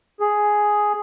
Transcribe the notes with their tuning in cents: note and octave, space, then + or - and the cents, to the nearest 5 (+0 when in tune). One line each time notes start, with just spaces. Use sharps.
G#4 +5